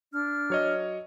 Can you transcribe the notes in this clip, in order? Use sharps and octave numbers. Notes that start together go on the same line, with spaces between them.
D4 F6
F#3 C#5 D#5